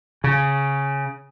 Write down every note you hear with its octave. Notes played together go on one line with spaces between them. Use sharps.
C#3